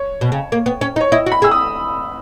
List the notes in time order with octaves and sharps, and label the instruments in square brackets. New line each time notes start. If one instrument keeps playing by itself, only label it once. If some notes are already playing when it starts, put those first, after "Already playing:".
Already playing: [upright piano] C#5
[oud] B2
C#3
A#3
B3
C#4
D#4
[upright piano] C#5
[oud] E4 [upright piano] D#5
[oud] F#4
[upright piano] B5
[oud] G#4 [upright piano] E6
[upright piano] D#6